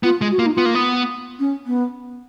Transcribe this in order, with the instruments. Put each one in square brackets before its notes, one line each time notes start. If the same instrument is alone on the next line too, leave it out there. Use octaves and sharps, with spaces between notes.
[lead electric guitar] B3 [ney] F4
[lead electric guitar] G#3
[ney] F#4
[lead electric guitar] A#3 [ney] F4
[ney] D#4
[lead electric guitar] B3 [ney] F4
[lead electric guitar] A#3
B3
[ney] C#4
B3